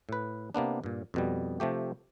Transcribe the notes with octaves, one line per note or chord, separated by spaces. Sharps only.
A2 B4
C3 A#3 B3 D4
G2 A#2
F2 B2 G3
C3 F3 A3 G4